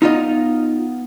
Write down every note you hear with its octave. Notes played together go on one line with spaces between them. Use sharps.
B3 D#4 F4 D#5